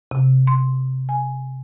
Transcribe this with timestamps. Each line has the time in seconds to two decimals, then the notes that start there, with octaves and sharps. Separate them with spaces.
0.11 C3
0.47 C6
1.09 G#5